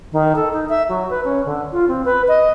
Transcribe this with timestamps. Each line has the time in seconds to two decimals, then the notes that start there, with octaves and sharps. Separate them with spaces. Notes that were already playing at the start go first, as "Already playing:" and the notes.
0.12 D#3
0.35 A4
0.52 D#4
0.69 E5
0.88 F#3
1.10 B4
1.24 C#4
1.45 D3
1.72 F4
1.87 C4
2.05 B4
2.28 D#5